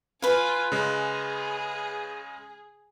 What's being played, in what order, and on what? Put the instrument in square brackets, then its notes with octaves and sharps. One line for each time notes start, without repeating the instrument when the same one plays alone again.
[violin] F4 G#5 [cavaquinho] B4 F5
[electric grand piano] C#3 G#3 [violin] G#4